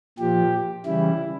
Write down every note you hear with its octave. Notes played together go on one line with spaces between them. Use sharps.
A#2 F3 G4
C#3 E3 G3 E4